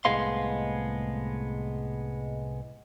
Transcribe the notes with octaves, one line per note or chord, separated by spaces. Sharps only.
C2 A2 G#3 B3 F5 C6